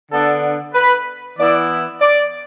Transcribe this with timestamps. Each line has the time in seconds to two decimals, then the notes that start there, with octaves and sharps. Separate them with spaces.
0.10 D3 B3 D4 A4
0.73 B4
1.37 E3 B3 E4 D5
2.00 D5